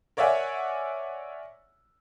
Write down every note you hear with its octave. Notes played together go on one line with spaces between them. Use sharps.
A#4 C#5 D5 E5 F#5 G#5